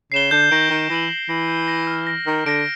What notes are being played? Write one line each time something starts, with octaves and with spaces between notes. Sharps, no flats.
C#3 C7 E7 G7
D3 G6
D#3 A#6 D7 F#7
D#3 G6
E3 A#6 D7 F#7
G6
E3 A#6 D7 F#7
G6
A#6 D7 F#7
F6
A#6 D7
D#3 F6
D3 A#6 D7